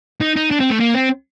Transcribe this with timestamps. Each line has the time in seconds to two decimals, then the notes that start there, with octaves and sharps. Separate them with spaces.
0.21 D#4
0.36 D#4
0.51 D4
0.60 C4
0.71 A3
0.80 A#3
0.95 C4